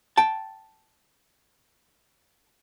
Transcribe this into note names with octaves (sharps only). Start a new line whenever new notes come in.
G5 A5